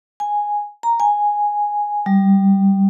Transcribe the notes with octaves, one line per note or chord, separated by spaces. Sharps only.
G#5
A#5
G#5
G3